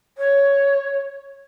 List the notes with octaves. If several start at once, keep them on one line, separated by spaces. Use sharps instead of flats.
C#5